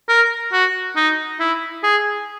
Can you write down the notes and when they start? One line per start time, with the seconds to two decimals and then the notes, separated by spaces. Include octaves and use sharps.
0.08 A#4
0.52 F#4
0.96 D#4
1.40 E4
1.83 G#4